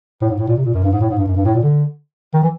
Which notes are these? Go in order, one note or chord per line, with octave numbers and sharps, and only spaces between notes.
A2
G#2
A2
A#2
C3
A#2
F#2
G2
G#2
A2
G#2
G2
F#2
G2
A2
A#2
D3
D#3
E3